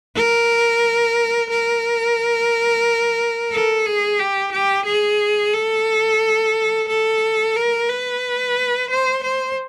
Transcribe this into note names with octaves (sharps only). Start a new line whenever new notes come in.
A#4
A#4
A4
G#4
G4
G4
G#4
A4
A4
A#4
B4
C5
C5